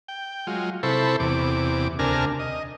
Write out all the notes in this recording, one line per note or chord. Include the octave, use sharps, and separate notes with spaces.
G5
F#3 G#3 F4
C3 E4 A4 C5 B5 C#6
E2 C3 D6
D2 C3 D4 A#4 G#5 F6
D#5